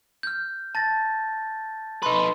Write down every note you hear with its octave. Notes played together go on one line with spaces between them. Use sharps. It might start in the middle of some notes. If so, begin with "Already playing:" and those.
F6 G6
A5 A6 A#6
D#4 B4 C6